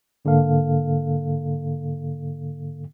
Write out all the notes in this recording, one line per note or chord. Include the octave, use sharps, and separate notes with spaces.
G#2 D3 A#3 A4 F5